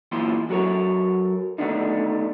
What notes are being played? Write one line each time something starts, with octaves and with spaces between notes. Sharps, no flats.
A#2 E3 B3 F4 C6
F#3 F#4 A4 A#4 C#5
D3 D#3 A3 B3 D4 D#4